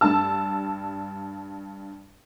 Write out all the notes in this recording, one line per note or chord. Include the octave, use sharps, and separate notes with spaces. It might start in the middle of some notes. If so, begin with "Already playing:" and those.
G2 D4 A5 E6